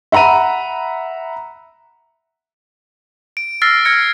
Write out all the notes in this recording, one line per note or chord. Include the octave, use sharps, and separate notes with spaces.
E5 F#5 A#5 B5 D#7
D7
E6 F6 A6 A#6 C7
E6 F6 G#6 A#6 C#7